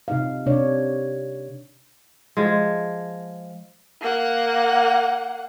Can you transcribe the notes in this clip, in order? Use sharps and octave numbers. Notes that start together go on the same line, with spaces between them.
C3 D#4 F5
C3 D4 C#5 D5
F3 G#3
A#3 F#5